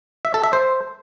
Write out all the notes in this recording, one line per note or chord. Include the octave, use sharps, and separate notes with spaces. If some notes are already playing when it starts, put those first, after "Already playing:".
E5
A4
E5
C5